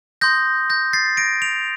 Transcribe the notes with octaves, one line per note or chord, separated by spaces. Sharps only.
C6 D#6 G6 A#6
G6 A#6
A6 C7
A#6 D7
D7 F7